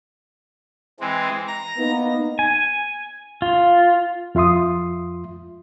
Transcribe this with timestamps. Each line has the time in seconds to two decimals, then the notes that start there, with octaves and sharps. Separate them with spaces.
1.00 E3 G#3 C4
1.47 A#5 A#6
1.77 A#3 B3 D#4
2.39 G#5
3.42 F4
4.35 F2 F4 E5 C6 D#6